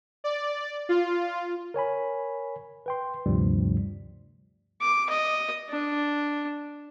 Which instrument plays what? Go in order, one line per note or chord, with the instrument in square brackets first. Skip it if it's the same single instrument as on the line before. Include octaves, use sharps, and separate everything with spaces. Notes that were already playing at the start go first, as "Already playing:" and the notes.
[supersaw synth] D5
F4
[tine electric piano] A#4 C#5 G#5 B5
B4 G5 C6
D2 G2 C3 F3 G3
[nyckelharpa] D6
D#5
D4